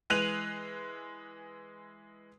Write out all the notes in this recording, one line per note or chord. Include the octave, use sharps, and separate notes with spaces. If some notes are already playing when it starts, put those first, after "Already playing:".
E3 G#3 F#6 D#7 F7 F#7